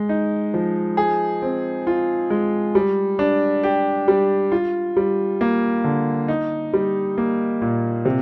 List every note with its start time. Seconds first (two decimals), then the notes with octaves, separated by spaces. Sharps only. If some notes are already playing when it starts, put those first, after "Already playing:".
Already playing: G#3
0.09 D#4
0.54 F3
0.97 G#4
1.42 C4
1.87 F4
2.30 G#3
2.75 G3
3.19 D4
3.63 G4
4.08 G3
4.52 F4
4.97 G3
5.41 A#3
5.84 D3
6.28 D#4
6.73 G3
7.18 A#3
7.62 A#2
8.05 C3